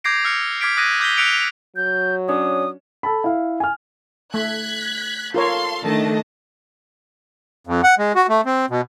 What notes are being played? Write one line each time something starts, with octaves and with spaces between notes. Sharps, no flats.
D6 G6 G#6 A#6 C7 D7
E6 F6 C#7
D6 F6 G#6 B6 C7 D7
D6 D#6 F#6 G#6 A#6 D#7
D6 G6 A#6 B6 G7
E6 F#6 B6 C#7 D7 F7
F#3 G6
C#4 D4 C#5 D#6
A4 A5 B5
E4 F5
G#5 F6
A3 F#6 G#6 B6
F4 A4 A#4 C#5 F5 C6
D#3 A3 D4 D#5 A5
F2
F#5
G#3
F#4
A3
C4
B2